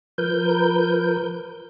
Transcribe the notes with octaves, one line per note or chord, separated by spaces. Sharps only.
F3 A#4 B4 G6